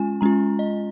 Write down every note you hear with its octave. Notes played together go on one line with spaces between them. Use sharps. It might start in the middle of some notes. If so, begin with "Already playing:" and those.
Already playing: G#3 C#4 F4 G#5
G#3 C#4 F4 A#5
D#5